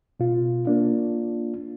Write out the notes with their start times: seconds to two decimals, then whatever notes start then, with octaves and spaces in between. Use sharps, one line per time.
0.20 B2 F4
0.65 A#3 D4 F4